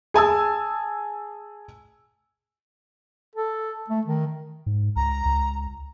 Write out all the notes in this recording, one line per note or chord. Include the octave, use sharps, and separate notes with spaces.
G#4 G#5 A5 E6
A4
A3
D#3
G#2
C#2 A#5
C#2